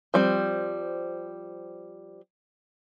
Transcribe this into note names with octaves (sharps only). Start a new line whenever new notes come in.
F3 G3 C4